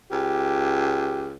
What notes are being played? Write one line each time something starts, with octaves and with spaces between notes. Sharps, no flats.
C#2 G4